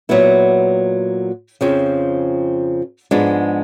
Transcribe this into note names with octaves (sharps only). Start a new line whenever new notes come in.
A#2 F#3 B3 E4
F2 C#3 F3
G#2 F3 G#3 B3 D4